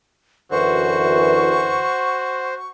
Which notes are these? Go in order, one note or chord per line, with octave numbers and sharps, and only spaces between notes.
F#2 D3 E3 F#4 C5 C#6